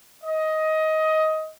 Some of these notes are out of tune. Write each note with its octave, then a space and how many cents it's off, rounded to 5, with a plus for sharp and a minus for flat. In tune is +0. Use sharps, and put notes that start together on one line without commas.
D#5 +15